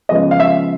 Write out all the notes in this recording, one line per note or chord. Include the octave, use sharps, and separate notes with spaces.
C#3 F3 G#3 B3 D#5
F5
E5